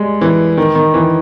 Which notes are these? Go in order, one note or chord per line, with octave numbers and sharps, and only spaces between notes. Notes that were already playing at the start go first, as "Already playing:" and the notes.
Already playing: G3 G#3
E3
D#3
D#3
E3